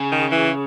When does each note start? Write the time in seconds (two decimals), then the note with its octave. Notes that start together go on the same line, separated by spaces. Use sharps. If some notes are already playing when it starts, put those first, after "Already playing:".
Already playing: C#3
0.12 D#3
0.31 E3